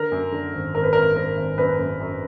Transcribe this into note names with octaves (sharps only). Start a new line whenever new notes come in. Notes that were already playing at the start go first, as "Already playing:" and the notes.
Already playing: D3 A#4
F#2
D3
G#1
G#1 A#4
B4
G#1 A#4
G#1 A#4
G#1
F#2 B4
F#2
F#2